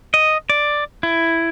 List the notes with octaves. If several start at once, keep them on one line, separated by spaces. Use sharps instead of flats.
D#5
D5
E4